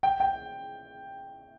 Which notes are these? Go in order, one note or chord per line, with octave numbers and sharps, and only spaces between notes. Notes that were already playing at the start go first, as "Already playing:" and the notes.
G5
G5